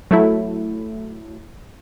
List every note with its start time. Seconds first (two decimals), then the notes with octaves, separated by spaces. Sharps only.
0.11 F#3 A3 E4